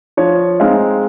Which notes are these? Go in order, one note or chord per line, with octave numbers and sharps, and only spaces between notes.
F3 C#5
G#3 C4 D#4 F5